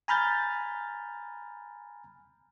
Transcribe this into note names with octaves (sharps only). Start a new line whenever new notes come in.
G#5 A#5 B5 F6 G6 A6